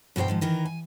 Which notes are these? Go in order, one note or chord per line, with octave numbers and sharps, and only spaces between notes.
G2 B2 G4 C5 G5
G#2 D#3 F3
D#3 E3 D#4 A#4
G#5